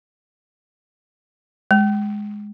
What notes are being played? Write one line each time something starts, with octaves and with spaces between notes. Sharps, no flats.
G#3